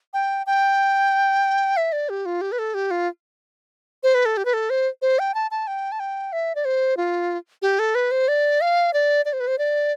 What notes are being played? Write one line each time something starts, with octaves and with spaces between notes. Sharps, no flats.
G5
G5
E5
D5
G4
F4
G4
B4
A4
G4
F4
C5
B4
A4
G4
B4
A4
C5
C5
G5
A5
A5
G5
A5
G5
E5
D5
C5
F4
G4
A4
B4
C5
D5
F5
D5
D5
C5
B4
C5
D5